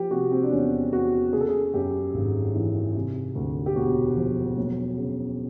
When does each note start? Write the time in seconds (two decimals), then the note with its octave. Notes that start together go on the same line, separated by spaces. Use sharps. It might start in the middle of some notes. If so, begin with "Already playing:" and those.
Already playing: F3 G4
0.11 C3 F#4
0.31 C4
0.43 D4
0.52 E2 C#4
0.93 E2 F#4
1.32 C#3 G#4
1.40 A4
1.49 G#4
1.74 F#2 G4
2.14 G#1
2.55 E3
2.95 C3
3.35 D2
3.66 G4
3.76 E1 F#4
4.16 F3
4.57 F#3
4.97 C#3